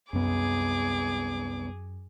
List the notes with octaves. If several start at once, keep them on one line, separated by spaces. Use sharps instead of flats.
C2 F#2 B3 G#4 D6